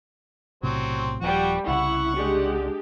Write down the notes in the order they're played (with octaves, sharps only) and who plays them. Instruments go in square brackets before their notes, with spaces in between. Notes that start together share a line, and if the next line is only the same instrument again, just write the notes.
[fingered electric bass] B1 A2 C3 [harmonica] F#3 C4
[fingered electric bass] D#1 F3 [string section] G3 [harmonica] F#4
[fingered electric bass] C2 C#3 [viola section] E4 [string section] F#5 [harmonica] C#6
[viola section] G#3 D4 G4